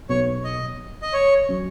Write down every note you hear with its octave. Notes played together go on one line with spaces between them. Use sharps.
B1 B2 B3 C#5
D#5
D#5
C#5
F#3 C#4